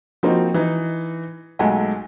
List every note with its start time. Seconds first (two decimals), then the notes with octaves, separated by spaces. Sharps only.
0.23 F3 A#3 C4 D#4 F#4
0.54 E3 D#4
1.59 B1 G#3 A3 F#5 G#5